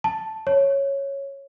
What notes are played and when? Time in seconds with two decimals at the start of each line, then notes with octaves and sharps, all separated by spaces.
0.04 A5
0.47 C#5